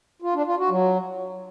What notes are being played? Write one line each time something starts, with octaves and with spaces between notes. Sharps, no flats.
F4
D4
F4
F#4
F#3